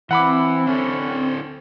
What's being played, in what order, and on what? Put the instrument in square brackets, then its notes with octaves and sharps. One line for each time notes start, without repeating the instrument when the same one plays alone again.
[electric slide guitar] E3 [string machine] C4 [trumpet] E4 [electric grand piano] F#5 B5 D6
[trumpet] C#4 [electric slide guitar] D4 E4 A4